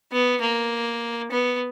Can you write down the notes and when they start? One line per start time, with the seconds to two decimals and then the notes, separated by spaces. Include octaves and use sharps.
0.12 B3
0.41 A#3
1.31 B3